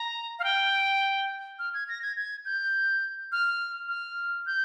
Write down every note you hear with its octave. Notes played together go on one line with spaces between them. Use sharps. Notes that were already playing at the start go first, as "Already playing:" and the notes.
Already playing: A#5
F5
G5
F6
G#6
A#6
G#6
G#6
G6
F6
F6
G6